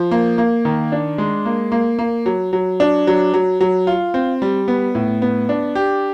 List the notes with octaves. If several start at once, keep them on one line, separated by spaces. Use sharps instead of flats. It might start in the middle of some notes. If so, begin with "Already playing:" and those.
Already playing: F3
A#3
A#3
D#3
D4
G#3
A#3
A#3
A#3
F#3
F#3
D4
F#3
F#3
F#3
F4
C4
G3
B3
A2
B3
D4
G4